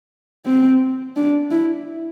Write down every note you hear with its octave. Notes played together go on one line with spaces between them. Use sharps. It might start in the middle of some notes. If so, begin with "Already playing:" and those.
C4
D4
E4